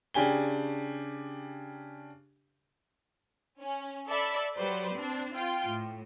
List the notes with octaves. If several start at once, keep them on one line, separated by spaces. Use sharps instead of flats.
C#3 D4 G4 G#5 G7
C#4
A4 D5 E5 B5
F#3 G4 B4 C5 D5
C4 D4
F4 G5
A2